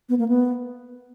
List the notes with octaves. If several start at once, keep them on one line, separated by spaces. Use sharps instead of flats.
B3
A#3
B3